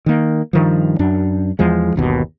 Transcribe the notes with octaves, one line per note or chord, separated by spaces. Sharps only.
D#3 A#3
G2 D#3 F3
F#2 D4
E2 F3 G#3
G1 D#2 B2